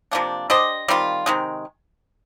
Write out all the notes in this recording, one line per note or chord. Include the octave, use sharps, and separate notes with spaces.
C3 F3 A#3 D4
D4 G4 C5 D#5
D#3 G3 C4 F4
C3 D#3 G#3